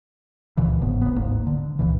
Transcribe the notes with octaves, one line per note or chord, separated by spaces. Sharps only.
C#2 A#2 D3 E3
G1 G#2 C#3 B3
D#1 B3
D1 G#1 G#2 A#3
D3
C#2 A#2 E3